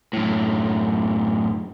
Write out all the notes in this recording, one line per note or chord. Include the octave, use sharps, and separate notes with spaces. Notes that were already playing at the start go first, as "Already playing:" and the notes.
F#2 A2